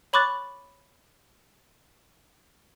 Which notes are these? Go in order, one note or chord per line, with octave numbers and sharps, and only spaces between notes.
C#5 B5 C#6 D6 F#6 A6